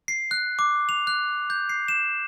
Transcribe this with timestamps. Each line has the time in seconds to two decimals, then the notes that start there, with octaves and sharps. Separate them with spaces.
0.08 C7
0.31 F#6
0.59 D6
0.89 F7
1.07 F#6
1.50 G6
1.69 C7
1.88 E7